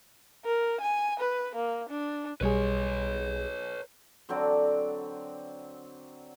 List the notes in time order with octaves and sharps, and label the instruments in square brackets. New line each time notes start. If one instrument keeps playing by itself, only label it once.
[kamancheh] A#4
G#5
B4
A#3
D4
[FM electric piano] B1 G3 G#4 [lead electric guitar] B4 C#5
[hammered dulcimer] D3 F#3 C4 D5